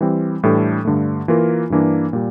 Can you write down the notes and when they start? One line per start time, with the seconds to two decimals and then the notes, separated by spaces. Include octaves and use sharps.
0.01 E3 G3 C4
0.43 A2 E3 G3 D4 A4
0.85 G2 D3 A3
1.28 E3 A#3 F4 A#4
1.70 G2 E3 A#3 D4
2.13 A#2 G3